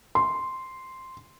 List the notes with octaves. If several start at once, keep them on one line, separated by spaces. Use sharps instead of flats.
C6